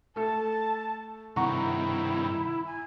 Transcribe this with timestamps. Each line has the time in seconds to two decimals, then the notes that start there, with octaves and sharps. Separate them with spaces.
0.16 A3 A4 A5
1.36 G2 C3 D#3 E4 F#5 A#5 C#6
2.66 G#5